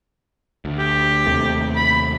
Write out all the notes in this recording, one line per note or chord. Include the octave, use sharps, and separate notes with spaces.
D2
G4
D#2 C3 A3
B5